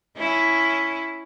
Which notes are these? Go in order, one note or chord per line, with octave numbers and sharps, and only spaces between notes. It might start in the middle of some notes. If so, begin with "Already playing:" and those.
C#4 E4